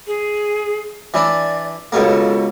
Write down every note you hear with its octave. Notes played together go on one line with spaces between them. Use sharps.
G#4
E3 D4 D5
C#2 B2 A#3 A4